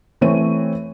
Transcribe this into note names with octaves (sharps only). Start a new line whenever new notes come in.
E3 A3 C4 C#5 D#7